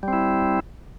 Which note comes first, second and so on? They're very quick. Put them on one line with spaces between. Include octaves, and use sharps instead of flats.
G3 C4 E4